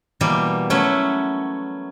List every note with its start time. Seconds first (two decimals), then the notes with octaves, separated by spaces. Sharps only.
0.21 B2 E3 G3 A#3
0.70 F#3 A3 C#4 E4 F#5